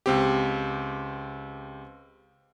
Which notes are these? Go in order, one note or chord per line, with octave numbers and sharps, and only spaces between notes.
C#2 C4 G4